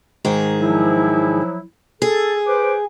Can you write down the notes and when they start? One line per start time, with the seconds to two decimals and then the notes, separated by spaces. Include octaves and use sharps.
0.25 G#2 D#3 G#4
0.59 F3 F#3 E4
2.02 G#4 A4
2.47 B4 C5 D6